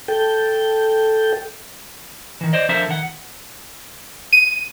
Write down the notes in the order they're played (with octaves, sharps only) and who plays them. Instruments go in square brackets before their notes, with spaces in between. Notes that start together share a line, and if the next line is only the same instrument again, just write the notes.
[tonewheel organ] A4 G5
[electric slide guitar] D#3 E3
C5 D5 D#5
F3 D4 A4 A#4 C5 E5
D#3 F#5
[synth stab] D#7